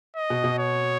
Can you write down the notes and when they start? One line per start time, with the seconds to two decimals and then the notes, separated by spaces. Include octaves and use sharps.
0.16 D#5
0.30 B2
0.44 B2
0.58 C#5